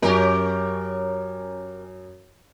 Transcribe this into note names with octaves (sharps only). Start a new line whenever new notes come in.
F#2 C#4 G4 A#4